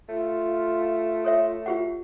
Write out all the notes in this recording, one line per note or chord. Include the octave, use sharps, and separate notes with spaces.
A3 F4
A4 C#5 E5
F4 G4 F#5